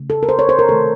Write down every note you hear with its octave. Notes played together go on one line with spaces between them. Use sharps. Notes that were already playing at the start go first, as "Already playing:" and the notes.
Already playing: C#3 A3
A4
A#4
C5
C#5
C5
A#4
C3 D#3 A3 A4